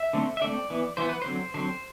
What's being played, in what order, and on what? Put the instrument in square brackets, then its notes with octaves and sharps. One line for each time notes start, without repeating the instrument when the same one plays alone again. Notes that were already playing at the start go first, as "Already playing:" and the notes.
Already playing: [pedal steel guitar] E5
D3 A3 C4
E5
D3 A3 C4 D5
E3 B3
E3 B3 C5
B4
D3 F#3 C4 C5
D3 F#3 C4 C5